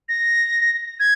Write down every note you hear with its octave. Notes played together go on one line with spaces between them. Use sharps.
A#6
G#6